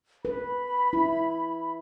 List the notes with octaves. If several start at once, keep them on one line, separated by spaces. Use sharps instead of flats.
B4 B5
E4